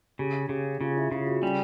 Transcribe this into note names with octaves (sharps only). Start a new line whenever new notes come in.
C#3 G4
C#3 G4
C#3 F4
E4
C#3 F4
F#4
G3 C#4